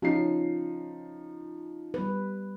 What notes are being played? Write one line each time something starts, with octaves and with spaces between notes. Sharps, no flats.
F3 C#4 D#4 F4 C7
G3 B4